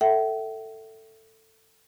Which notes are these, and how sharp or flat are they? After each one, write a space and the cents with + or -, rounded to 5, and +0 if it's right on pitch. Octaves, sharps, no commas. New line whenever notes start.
A4 +15 E5 +0 G5 -45